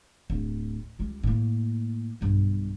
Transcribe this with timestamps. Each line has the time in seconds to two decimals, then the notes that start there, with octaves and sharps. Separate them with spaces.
0.30 D1
0.99 C#2 G3
1.23 A2 A#3
2.21 B1 G2